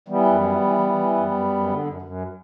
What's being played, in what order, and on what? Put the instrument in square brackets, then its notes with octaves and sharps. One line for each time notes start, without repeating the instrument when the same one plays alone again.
[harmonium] E3 G3 B3
F#2
E3
E3
E3
E3
F#2
F#2
F#2
D3
F#2
F#2